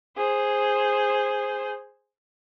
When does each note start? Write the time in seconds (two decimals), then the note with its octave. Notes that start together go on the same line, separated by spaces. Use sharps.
0.17 G#4 C5